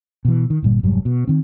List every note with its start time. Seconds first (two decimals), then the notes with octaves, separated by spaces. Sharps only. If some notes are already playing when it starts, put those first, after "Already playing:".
0.25 B2 E3
0.50 D#3
0.63 G1 A#2 G3
0.83 F1 G#2 F#3 G3
1.05 B2
1.28 D#3 C4